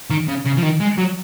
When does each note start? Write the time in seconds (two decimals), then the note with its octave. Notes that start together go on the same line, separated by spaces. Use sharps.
0.10 D#3
0.28 C#3
0.45 C#3
0.57 F3
0.62 D#3
0.80 G#3
0.97 F#3